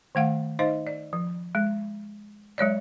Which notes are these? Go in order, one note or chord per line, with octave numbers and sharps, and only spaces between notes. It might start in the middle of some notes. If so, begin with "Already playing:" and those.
D#3 A3 F5 F#5
D#4 C5 D#5 F5
D5
F3
G#3
F#3 G#3 C#5 D5